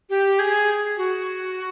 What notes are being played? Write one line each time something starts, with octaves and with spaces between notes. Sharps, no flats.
G4
G#4
F#4